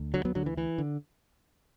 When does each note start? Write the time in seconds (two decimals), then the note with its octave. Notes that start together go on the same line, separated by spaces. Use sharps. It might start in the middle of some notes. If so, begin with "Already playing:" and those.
Already playing: D2
0.14 D3 F#3
0.25 F#3 B3
0.35 D3 F#3
0.46 E3
0.57 E3
0.78 D3